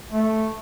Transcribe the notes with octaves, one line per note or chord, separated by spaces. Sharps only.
A3